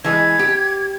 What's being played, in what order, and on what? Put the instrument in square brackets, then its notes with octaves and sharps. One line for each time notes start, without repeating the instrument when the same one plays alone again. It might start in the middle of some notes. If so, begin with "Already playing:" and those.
[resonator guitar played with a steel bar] E3 G#3 [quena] G#6
[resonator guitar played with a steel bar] G4